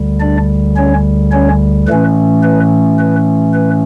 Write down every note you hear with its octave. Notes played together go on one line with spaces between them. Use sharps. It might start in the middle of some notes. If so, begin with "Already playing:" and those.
Already playing: D2 D3 G3
D4 D5
C#4 C#5
C#4 C#5
A2 E3 A3 C#4 B4
B4
B4
B4